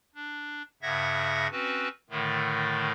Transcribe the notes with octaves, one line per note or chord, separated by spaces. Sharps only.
D4
G2 C#3 E5 F#5 G#6 A#6
C4 C#4 F#4 B4
A2 D3 D#3 A3